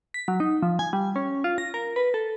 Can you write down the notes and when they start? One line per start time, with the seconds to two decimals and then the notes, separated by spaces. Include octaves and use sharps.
0.14 B6
0.28 F#3
0.40 D#4
0.63 F3
0.79 G#5
0.93 G3
1.16 C#4
1.44 F4
1.58 A#6
1.74 A#4
1.96 B4
2.14 A4